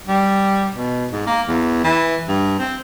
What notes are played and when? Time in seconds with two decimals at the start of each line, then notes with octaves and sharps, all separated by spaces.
0.07 G3
0.73 B2
1.12 G#2
1.27 A#3
1.48 E2
1.84 E3
2.28 G2
2.59 C4